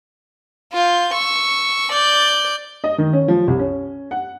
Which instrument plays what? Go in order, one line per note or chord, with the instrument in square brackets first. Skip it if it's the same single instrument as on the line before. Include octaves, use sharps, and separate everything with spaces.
[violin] F4 G6
C#6 E6
D5 G6
[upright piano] D#5
D#3
C#4
F3
C2
C#4
F#5